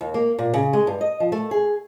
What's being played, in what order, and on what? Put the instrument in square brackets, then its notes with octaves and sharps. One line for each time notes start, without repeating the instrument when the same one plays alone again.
[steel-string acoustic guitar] D#2
A#3
A#2
C#3
G#3
G2
D#5
F3
A3
G#4